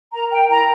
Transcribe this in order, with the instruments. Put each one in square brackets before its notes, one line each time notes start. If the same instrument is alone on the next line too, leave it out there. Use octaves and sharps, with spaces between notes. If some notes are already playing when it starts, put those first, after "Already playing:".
[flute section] A#4 A#5
G5
E4 A#5